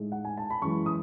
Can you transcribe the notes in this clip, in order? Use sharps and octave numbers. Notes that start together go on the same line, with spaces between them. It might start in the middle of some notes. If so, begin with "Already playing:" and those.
Already playing: A2 G#3 D#4
F#5
G#5
A5
B5
F#2 E3 G#3 C#6
D#6